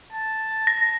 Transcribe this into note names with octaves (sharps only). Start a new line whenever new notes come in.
A5
A#6